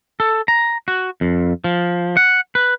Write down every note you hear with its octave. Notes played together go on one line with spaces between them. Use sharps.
A4
A#5
F#4
F2
F3
F#5
B4